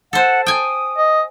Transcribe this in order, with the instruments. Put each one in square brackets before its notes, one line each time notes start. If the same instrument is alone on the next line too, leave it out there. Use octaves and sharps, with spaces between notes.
[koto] A4 C5 [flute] F#5
[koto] G5 G#5 [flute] D#6
[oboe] D#5